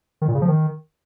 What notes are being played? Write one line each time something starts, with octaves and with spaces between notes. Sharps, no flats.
D#3
A#2
C#3
F3
D#3